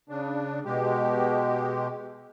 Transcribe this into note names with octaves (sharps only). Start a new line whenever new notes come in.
C#3 D4
B2 G#3 G4